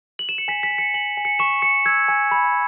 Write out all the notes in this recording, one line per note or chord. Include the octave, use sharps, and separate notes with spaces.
F#7
E7
C#7
G#5 B6
B6
G#5
C#7
G#5 F#7
G#5
C#7
C#6 E7
C#6 C#7
E6 G#6
G#5
B5